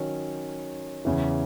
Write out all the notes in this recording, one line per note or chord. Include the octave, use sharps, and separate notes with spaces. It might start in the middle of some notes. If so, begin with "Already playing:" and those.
Already playing: D#3 F#3 C#4
E2 C#3 E3